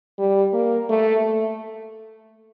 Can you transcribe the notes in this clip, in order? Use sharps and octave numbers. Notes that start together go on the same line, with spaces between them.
G3
A#3
A3